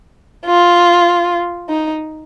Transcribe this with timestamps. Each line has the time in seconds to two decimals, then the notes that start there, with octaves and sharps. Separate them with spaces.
0.46 F4
1.69 D#4